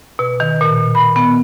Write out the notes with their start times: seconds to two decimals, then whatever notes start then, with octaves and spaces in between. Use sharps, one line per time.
0.19 B2
0.40 D#3
0.61 A#2
0.95 B5
1.16 B3